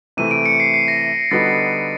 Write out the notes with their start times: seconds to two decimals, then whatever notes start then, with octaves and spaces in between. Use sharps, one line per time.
0.17 C3 E3 A3 D#7
0.31 D7
0.46 C#7
0.60 C7
0.74 C7
0.88 A#6
1.31 D3 G3 B3 D#4 F#4 A6